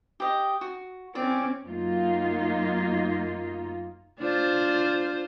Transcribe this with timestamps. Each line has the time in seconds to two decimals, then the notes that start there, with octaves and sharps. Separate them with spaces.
0.20 G4 D#5
0.61 F#4
1.15 C4 C#4 D5
1.64 F#2 A#3 D#4 F4
4.19 D4 F4 C5